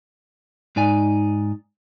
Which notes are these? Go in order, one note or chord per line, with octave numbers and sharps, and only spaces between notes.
G#2 D#4 D5 G#5